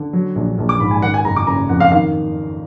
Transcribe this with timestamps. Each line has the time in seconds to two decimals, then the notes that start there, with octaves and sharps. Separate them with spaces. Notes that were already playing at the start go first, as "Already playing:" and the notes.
Already playing: D3
0.13 F#3
0.36 A#1
0.58 A#1
0.69 D6
0.80 G#2 B5
0.91 G#5
1.02 D#3 F#5
1.14 G#5
1.25 F#1 A#5
1.36 D6
1.47 F#1 A#5
1.69 F2 F#5
1.80 F5
1.92 D#3 F5